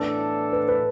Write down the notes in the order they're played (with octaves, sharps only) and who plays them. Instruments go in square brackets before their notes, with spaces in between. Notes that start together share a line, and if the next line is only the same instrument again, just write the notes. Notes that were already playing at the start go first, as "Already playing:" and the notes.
Already playing: [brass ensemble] A2 E3 B3 D4 A4 [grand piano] A5
[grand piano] B4
B4